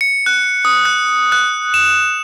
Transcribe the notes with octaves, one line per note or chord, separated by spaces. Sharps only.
C#7
F#6
D#6
F#6
F#6
E7